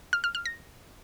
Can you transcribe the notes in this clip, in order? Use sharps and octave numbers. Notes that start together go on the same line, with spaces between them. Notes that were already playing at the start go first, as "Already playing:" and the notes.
F6
F6
F6
A#6